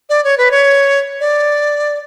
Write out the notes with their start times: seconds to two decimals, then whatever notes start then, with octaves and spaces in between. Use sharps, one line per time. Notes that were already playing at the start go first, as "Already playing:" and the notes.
0.10 D5
0.24 C#5
0.38 B4
0.51 C#5
1.20 D5